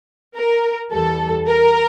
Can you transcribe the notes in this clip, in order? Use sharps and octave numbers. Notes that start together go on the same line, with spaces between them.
A#4
E2 E3 G3 A4
A#4